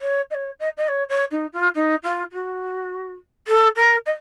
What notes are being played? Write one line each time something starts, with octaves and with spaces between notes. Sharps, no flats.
C#5
D#5
C#5
D#5
D#5
C#5
C#5
D#4
F4
D#4
F4
F#4
A4
A#4
D#5